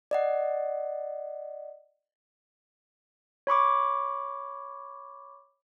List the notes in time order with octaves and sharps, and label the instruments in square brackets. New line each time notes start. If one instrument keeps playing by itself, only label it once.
[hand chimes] D5 D#5 F#5
[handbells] C#5 B5 C#6 D6